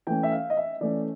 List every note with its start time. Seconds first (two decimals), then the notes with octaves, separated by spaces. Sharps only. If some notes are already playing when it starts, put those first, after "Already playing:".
0.07 E3 A3 C#4 G5
0.23 E5
0.32 F5
0.50 D#5
0.57 E5
0.81 E3 A3 C#4 D5